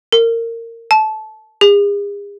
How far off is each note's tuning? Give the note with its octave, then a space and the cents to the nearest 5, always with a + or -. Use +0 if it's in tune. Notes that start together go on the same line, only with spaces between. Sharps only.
A#4 -20
A5 -20
G#4 -40